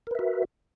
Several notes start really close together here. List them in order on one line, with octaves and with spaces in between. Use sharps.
A#4 B4 E5 F#4